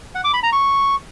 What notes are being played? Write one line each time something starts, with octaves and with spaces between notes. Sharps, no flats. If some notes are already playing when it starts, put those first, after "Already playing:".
F#5
D6
B5
A#5
C#6